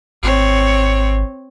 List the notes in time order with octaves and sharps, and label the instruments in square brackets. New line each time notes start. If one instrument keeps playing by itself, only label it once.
[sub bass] G#1 [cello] C4 C#5